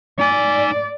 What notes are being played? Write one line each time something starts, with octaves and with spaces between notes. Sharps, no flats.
D#4 D5 G#5